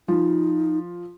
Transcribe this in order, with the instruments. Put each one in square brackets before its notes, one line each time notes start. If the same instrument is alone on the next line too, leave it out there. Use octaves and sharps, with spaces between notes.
[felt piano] F3 [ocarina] D#4